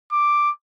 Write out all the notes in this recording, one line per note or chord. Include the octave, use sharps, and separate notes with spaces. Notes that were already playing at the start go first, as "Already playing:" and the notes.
D6